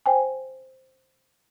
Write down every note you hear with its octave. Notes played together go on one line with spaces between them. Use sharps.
C5 G5 G#5